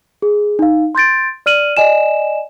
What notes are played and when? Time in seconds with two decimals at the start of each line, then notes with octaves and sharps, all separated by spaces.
0.22 G#4
0.59 D#4 F5
0.95 C6 G6 A6 D7
1.46 D5 F6 D#7 F#7
1.77 D5 D#5 G#5 E7